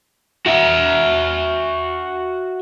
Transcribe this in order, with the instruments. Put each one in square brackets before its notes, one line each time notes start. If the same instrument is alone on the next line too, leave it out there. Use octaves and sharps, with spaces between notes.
[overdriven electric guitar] F#4 E5